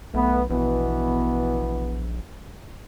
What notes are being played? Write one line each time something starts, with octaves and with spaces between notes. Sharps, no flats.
B1 A3 B3
A#1 B2 E3 B3